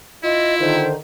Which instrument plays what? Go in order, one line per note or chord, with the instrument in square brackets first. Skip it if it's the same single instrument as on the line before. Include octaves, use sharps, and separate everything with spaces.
[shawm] E4 [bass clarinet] F4 [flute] D#5
[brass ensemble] D3 D#3 [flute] C5